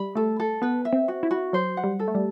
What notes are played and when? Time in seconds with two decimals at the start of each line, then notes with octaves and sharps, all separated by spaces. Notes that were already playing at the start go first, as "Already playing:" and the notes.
Already playing: G3 B5
0.15 A3 A4
0.40 A4
0.62 B3 B4
0.85 E5
0.93 C4
1.08 F#4
1.23 E4
1.31 F#4
1.53 F#3 C5
1.77 F#5
1.84 G3
1.99 A4
2.08 A3
2.15 G3